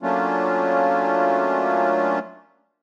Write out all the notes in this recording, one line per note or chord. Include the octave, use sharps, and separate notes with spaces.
F#3 A3 A#3 C#4 D4 F4